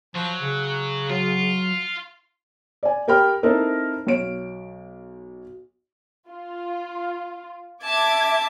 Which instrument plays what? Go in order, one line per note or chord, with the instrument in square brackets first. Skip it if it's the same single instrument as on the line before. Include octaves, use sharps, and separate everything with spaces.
[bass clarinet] F3 [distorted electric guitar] F#3
[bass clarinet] C#3
[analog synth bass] F#3 [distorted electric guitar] F4
[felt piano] D5 G#5
G4 A#4 G5 B5 F6
C4 D#4 E4 A4 A#4 C5
B1 C#5 D7
[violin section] F4
[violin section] E5 D6 G#6 [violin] A5